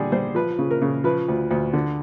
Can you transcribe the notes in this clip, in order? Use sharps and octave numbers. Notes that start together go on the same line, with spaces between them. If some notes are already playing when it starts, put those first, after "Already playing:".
Already playing: D3 G3 G#4
G3 C5
F3 B4
C#3
A#4
C#3
F3 B4
D2
D2
D3